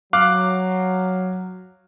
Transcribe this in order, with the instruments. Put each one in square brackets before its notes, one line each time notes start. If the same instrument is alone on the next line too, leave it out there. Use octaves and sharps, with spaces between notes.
[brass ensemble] F#3 [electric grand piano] F5 D6 F#6